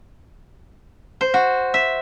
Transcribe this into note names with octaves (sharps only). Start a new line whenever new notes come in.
C5
F#4
E5